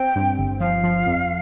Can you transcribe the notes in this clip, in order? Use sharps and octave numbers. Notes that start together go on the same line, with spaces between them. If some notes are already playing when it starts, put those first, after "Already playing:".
Already playing: C4 G5
G2
G1
F3 F5
F3
F2